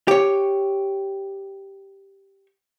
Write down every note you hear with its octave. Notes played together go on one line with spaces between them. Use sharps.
G4 C#5